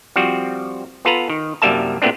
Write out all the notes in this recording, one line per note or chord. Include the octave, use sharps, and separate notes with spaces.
F3 G3 C4 F#4
B3 F4 A4 B4 A#5
D#3
C2 F#2 G3 A#3 E5 A5
A#2 A3 B3 C4 D4